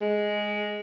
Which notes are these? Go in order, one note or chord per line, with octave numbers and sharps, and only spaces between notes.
G#3